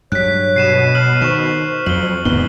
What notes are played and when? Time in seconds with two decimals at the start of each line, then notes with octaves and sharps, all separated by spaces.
0.12 G2 F#3 C#5 F#6 B6
0.56 B2 C7 D#7 E7
0.95 F6 D#7 F#7
1.22 D#3 C5 C#6 E7
1.86 F2 F#3 F#7 G7
2.25 E2 G#2 D3 B3 D4 G7